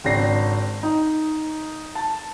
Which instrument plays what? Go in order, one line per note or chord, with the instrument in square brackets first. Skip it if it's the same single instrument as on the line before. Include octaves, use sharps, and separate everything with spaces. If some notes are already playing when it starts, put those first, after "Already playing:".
[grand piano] G#1 C#3 C4 D4 A#6 C7
D#4
A5